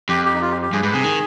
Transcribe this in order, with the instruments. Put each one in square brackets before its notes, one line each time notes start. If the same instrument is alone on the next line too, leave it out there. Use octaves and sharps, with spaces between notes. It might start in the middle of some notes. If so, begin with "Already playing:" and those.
[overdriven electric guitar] F2 [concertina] G4
[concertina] G4
D#4
F4
G4
G4
[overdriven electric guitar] G2 [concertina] G#4
[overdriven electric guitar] G#2 [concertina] B4
[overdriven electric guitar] C3 [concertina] G#4
[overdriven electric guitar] D#3